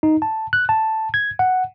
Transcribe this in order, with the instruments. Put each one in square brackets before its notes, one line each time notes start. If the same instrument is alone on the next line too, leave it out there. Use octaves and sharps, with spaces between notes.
[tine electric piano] D#4
A5
F#6
A5
G#6
F#5